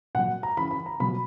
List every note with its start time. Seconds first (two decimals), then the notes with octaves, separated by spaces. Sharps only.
0.15 A#2 F#5
0.19 F#3
0.43 A#5
0.57 C#3 E3 B5
0.71 B5
0.86 A#5
1.00 B2 F#3 B5